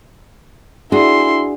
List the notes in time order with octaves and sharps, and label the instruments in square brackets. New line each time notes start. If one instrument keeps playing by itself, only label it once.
[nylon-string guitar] D4 F#4 G#4 [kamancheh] E4 C6